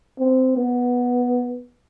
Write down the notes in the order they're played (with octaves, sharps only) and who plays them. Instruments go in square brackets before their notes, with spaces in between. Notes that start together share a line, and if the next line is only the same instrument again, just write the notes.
[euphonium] C4
B3